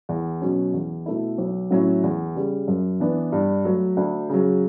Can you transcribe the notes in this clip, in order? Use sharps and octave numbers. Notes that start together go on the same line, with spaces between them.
E2
B2 F#3 C#4
E2
B2 A3 E4
B1
A2 F#3 C#4 E4
E2
C#3 G3
F#2
E3 B3 D4
G2
F#3 A3
D2
C#3 F#3